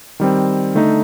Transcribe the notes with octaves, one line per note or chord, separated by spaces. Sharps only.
D#3 G3 C4
D3 A3 D#4